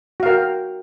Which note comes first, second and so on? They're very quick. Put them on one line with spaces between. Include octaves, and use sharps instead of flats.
F#4 F5 A#4 G5